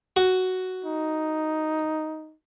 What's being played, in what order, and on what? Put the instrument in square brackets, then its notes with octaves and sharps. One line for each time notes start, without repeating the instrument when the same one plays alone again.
[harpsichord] F#4
[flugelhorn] D#4